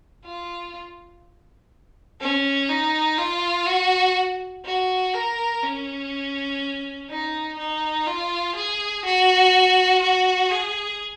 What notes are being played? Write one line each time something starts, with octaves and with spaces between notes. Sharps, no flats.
F4
C#4
D#4
F4
F#4
F#4
A#4
C#4
D#4
D#4
F4
G#4
F#4
F#4
G#4